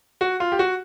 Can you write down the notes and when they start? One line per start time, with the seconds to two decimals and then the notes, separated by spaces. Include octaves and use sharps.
0.21 F#4
0.40 F4
0.52 G4
0.59 F#4